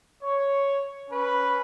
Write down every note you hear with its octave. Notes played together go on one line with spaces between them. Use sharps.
C#5
C#4 B4